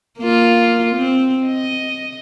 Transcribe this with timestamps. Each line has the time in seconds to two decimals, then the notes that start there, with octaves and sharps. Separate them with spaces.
0.19 A#3 F4
0.96 C4
1.47 D#5